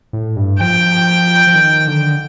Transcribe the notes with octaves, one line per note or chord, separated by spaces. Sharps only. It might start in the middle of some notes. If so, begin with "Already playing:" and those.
A2
G2
F3 G5
F3
D#3
D3